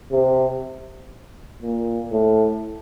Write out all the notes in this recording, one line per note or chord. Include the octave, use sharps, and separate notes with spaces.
C3
A#2
A2